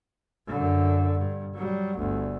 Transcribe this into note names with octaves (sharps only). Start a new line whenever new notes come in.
F#2 D3
G2
F#3 G3
G1 D2